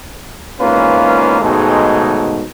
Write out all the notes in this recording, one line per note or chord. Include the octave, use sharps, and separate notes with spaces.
E2 G#2 A#3 C#4 F4 B4
B1 G#2 B2 D#3 G#3 A3